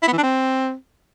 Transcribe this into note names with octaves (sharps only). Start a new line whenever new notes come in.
E4
B3
E3
D4
C4